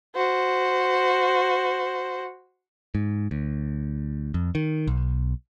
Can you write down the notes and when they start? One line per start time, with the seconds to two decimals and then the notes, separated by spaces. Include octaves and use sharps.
0.15 F#4 C5
2.95 G#2
3.31 D2
4.34 F2
4.55 D#3
4.87 B1